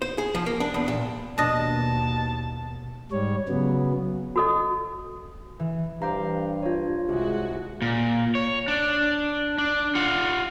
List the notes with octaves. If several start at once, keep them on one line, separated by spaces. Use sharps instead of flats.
C5
G#4
F3
A#3
D4
E2
A#2
D#2 B2 D4 D#5 A5
G#2 G3 C#5
C#3 F#3 B3
F#4 A4 D#5
E3
G2 G4 C5 F5 A#5
F4 C#5
C2 G#3 F#4
A#2
C#5
D4
D4
F4 F#5